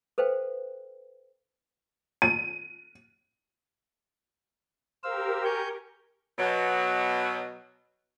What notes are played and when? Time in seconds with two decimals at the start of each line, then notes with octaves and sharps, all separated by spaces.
0.18 A4 B4 C5 F5 G5
2.22 D#7
5.04 G4 A#4 C5 F5 E6
5.45 G#5 C#6 G6
6.38 B2 F#3